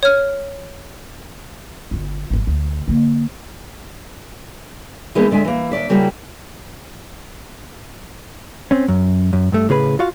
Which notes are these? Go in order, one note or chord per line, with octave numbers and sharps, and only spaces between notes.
C#5 F6
G1 F4
G#1 F2
D2
D3 A#3
E3 F3 G#3 A#3 B3 D#4
D3 G#3 E5 G#5
E3 A#3
D#2 C3 D5 E5
C#3 G3 A#3 E4 F#4 G4
C4 C#4
F#2
F#2
G2 A3
A2 C#3 G#4 B4 B5
F4 F#4 F5